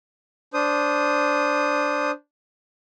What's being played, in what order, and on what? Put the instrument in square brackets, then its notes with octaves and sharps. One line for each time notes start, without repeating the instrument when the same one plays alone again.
[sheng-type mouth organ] D4 C5 D#6